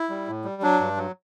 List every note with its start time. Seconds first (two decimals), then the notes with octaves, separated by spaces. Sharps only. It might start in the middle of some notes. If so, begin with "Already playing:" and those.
Already playing: E4
0.09 G3
0.28 A2
0.44 G3
0.62 F#3 D4
0.80 G2
0.97 F#3